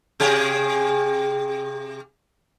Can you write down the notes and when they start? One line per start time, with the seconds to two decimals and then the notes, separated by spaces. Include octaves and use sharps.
0.20 C3 G4 G#4